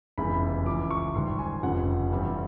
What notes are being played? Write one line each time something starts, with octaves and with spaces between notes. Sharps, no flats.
F1 E2 C#3 E3 G#3 B5
C#2 C#3 E3 D6
C#6
G#1 G#2 D#3 G3 C6
G#5
F1 F2 C#3 F3 F#5
G2 E3 G3 C4